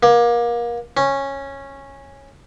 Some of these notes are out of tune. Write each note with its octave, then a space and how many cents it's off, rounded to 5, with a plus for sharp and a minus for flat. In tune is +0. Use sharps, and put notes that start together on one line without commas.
A#3 +30
C#4 -10